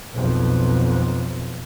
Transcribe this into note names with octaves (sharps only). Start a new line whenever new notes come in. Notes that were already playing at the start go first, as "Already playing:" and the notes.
B1 F2